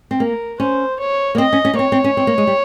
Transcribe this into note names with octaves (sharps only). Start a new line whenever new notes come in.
C4
A#3 A#4
C#4 C5
C#5
A#3
C4 D#5
C#4
C#4
A#3
C4 C#5
C4
C#4
C4
A#3
G#3
G3